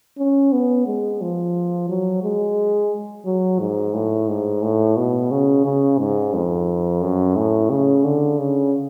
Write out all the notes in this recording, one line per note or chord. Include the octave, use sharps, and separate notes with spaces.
C#4
B3
G#3
F3
F#3
G#3
F#3
G#2
A2
G#2
A2
B2
C#3
C#3
G#2
F2
F#2
A2
C#3
D3
C#3